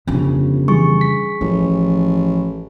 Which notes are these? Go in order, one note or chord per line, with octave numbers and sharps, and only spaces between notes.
G1 F2 C#3
E3 G3 G#4 C#6
B6
A1 F3